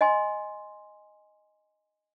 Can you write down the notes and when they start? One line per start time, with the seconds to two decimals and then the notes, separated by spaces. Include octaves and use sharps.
0.01 D#5 G#5 C6